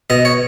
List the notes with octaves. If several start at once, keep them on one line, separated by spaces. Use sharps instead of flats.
B2 D#5
C#5